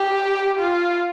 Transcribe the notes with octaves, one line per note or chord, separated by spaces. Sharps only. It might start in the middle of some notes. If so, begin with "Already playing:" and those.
Already playing: G4
F4